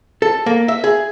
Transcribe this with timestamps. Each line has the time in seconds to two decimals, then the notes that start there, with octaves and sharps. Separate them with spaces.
0.22 A4
0.46 A#3
0.68 E5
0.84 G#4